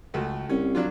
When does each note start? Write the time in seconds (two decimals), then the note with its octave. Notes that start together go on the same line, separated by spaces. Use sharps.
0.14 C#2 A3 F#4
0.49 C2 C#4
0.75 F#3 D4 F4